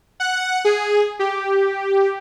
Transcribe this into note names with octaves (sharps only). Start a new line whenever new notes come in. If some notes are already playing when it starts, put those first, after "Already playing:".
F#5
G#4
G4